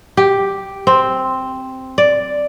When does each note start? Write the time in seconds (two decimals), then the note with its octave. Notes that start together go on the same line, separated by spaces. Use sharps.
0.17 G4
0.87 C4
1.98 D5